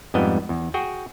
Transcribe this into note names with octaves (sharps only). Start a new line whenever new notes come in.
F2 G#2 G3 B3 D#5
E2
F#4 G#4 G5